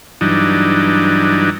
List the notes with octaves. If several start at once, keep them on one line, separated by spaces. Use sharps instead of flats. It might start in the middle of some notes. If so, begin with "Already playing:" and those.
G2 E3 F#3 D4 D#4